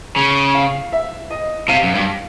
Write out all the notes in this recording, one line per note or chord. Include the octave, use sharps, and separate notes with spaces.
C#3
F5
E5
D#5
C3 F5
F#2
G2